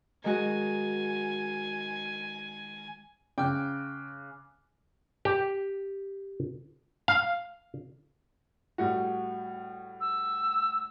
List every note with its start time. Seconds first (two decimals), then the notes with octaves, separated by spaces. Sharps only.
0.24 D#3 G#3 F#4 G#5
3.38 C#3 G5 D6 F6 F#6
5.25 G4
7.08 F5
8.78 A2 G3 F#4
10.01 E6